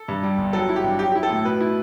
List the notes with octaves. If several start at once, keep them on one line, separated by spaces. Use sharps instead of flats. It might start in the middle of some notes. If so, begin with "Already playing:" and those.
Already playing: A4
G2
G3
G1
F#3 A4
E4
G4
G2
F#3 G4
E4 G4
A4
A2
B2 B4
E4